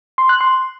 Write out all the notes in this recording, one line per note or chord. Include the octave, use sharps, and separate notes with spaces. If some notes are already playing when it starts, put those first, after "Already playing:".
C6
F#6
C6